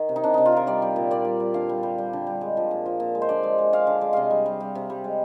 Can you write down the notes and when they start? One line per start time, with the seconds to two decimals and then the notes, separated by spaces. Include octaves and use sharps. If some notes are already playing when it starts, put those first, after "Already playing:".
Already playing: D#3
0.09 C3
0.16 D#4
0.24 C3 D4
0.34 C3 D#4
0.46 F4
0.52 D#3 A#4
0.67 G3 D5
0.82 G3
0.96 A#2
1.11 A#2 D5
1.25 G3
1.40 G3
1.54 D3 F5
1.69 G3
1.83 G3
1.98 G3
2.13 D3
2.27 G3
2.41 G#3
2.57 F3
2.71 A#2
2.86 F3
3.00 A#2
3.15 G#3
3.22 C5
3.29 D3 D5
3.43 G#3
3.58 G#3
3.73 G#3 F5
3.87 D3
4.01 G#3
4.13 C3 D#5 F5
4.31 G3
4.46 G3
4.60 G3
4.75 C3
4.90 G3
5.04 G#3